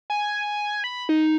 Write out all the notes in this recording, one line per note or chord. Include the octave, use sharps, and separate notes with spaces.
G#5
B5
D#4